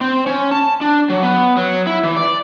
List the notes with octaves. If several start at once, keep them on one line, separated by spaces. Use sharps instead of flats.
C4
C#4
A5
D4
F#3
B3
F#3
E4
E3
D5